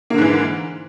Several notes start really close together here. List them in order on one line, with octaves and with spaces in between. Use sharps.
A#3 D3 G#2 E3